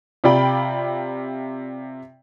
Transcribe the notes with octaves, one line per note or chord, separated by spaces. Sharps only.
C3 F4 D5 G5 B5